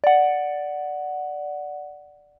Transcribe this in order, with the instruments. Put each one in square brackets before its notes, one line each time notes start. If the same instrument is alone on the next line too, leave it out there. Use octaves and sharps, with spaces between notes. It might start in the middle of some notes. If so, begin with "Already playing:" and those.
[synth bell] D5 F#5